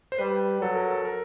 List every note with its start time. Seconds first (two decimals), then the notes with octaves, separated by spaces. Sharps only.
0.12 C5
0.18 G3 B4
0.61 F#3 A4
0.75 A#4
0.90 A4
1.05 A#4